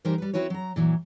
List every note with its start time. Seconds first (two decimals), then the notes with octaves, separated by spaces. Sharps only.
0.05 E3 G3 D#4 G4 A#4 C5
0.18 G3 B4
0.33 C4 E4 F#4 B4 C#5
0.50 F#3 A#5
0.76 A#2 E3 F#3